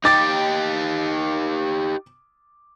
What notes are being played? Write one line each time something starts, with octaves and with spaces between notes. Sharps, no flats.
D#4 G4 D6 A6